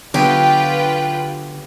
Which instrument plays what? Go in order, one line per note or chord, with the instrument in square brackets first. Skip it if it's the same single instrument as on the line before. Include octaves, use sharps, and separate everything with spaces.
[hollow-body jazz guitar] D3 [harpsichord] F#3 B3 D#6 [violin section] F4 B4 G5 [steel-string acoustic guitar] G4